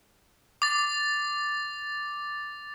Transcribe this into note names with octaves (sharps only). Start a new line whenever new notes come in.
D6 A6